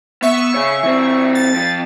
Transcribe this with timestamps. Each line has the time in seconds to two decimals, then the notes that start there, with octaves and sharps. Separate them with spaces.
0.22 B3 E5 C#6
0.54 C#3 C#5
0.83 E3 C4
1.35 A6
1.53 F2 F3